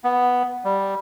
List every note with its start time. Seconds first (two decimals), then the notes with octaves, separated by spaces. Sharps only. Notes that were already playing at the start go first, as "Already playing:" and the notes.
0.04 B3
0.64 G3